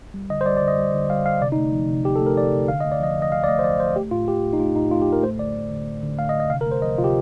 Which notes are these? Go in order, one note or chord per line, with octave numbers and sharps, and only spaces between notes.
G3
D3 D#5
C5
G3 D5
D5
D3
D#5
G3
D3
G3 F5
D3 F5
C3 D5
D#4
A3
F3
C3
C3 G4
A4
A3
A#4
F3 D5
C3
D3 F5
A3 D#5
D5
F3 D#5
D3
D#5
D3 F5
D5
A3 D#5
C5
F3 D5
D3 C5
A3 G4
A2 F4
A3 G4
A2
D#4
A3 F4
A2 D#4
A3 F4
G4
A2
A#4
A3 C5
D3 D5
A3
D3
A3
D3
A3 F5
D#5
D3
D#5
C3 F5
A#4
A3
C5
F3 D#5
C3 F4
G4